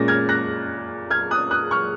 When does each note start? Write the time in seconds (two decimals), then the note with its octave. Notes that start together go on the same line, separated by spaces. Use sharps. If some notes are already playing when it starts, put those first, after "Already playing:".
Already playing: A#2 G#3 C#4 A#6
0.08 F6 G#6
0.29 F#6 A#6
1.10 F6 G#6
1.31 D#6 F#6
1.51 D#6 F#6
1.71 C#6 F6